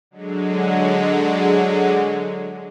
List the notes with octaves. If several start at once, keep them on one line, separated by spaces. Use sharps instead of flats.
D3 F#3 G#3